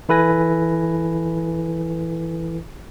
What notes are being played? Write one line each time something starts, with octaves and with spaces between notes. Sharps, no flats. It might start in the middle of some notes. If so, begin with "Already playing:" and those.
E3 E4 A4 B4 G#5 A#6